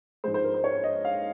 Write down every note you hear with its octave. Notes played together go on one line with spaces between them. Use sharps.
G#2 F3 G#3 C5
C5
A#4
C5
C#5
D#5
F5